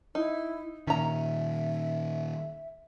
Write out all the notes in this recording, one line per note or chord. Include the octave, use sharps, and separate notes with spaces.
D#4 E4
A#2 D#3 C#4 E5 A#5